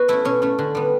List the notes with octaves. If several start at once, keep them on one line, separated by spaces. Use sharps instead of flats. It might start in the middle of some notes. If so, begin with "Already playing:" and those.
Already playing: B3 F#4
A3 C#4 E4
B2 C#4
A3 C#4
D3
G3 B3